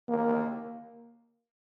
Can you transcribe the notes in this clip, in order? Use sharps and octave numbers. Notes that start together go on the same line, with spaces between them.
A#3